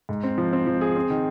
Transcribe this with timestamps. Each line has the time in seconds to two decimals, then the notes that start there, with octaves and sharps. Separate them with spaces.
0.09 G#2
0.23 C4
0.38 F3
0.53 C4
0.67 F3
0.81 G#4
0.96 C4
1.10 D#3